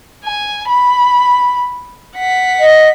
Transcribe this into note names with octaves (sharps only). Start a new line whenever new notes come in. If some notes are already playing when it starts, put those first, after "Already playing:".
G#5
B5
F#5 B6
D#5